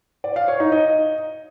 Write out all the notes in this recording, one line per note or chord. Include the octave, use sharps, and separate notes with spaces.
D5
F5
C#5
D#4
D#5